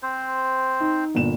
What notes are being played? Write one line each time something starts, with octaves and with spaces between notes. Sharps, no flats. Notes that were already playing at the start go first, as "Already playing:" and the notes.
C4 C5
D#4
G1 A#2 E7